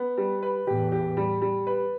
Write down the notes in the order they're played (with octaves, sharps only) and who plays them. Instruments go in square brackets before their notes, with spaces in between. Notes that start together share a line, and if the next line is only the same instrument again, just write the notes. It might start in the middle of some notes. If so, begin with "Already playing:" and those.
Already playing: [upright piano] B3
G3
B4
[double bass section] E2 A2 [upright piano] G4
[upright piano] G4
G3
G3
B4